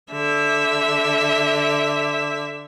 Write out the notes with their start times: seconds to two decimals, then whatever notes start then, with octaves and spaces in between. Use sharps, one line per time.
0.12 D3 E5